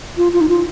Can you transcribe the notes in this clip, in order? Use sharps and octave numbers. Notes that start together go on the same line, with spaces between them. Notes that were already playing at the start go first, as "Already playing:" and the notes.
F4
F4
D#4
F4